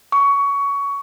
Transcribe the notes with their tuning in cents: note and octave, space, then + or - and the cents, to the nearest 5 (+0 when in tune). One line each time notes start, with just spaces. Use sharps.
C#6 +20